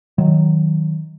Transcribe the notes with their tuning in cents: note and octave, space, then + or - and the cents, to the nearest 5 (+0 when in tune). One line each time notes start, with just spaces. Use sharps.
D#3 +15 F#3 +0